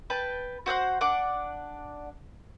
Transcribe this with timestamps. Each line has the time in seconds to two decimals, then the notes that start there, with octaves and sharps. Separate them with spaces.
0.10 B4 G5 A5
0.66 F#4 C5 D#5 F#5
1.01 D4 F#5 D6